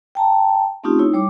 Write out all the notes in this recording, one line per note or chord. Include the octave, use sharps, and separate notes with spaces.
G5 A5 A#5
A3 C4 C#4 D#4 F4 G4
D#4 E4 C#5
G3 C#5 D6